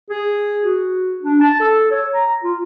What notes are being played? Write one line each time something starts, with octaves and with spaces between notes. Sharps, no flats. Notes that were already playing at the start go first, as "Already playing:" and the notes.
G#4
F#4
D4
A5
A4
C#5
A#5
F4